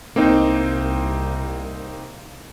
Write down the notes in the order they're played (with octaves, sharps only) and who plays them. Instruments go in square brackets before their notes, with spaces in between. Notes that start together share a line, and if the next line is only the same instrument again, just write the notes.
[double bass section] C2 [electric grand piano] A#3 C4 D#4